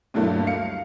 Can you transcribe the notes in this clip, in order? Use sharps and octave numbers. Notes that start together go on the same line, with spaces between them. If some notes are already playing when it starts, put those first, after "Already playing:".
D2 G2 F#3 A3 A#3
F5 C#7